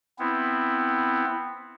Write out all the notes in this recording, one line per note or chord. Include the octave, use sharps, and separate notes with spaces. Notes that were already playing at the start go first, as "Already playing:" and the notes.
B3 C4 E4